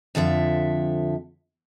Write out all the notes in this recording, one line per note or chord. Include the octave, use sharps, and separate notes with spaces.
F2 D3 F3 E5